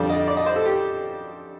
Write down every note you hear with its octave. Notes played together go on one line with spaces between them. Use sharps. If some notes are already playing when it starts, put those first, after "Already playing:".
Already playing: F2 D3 G3 D5
D#5
D5
D#5
C5
A4
G4